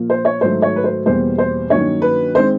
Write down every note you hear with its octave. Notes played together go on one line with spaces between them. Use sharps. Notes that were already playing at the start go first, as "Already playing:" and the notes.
Already playing: A#2 F3 A#3
C5
C#5
G#2 D#3 F#3 A3 C5
C#5
B4
C5
E2 B2 G3 A#3 C5
C5
G2 D#3 F#3 A#3 C#4 C#5
B4
D#3 G#3 C4 C5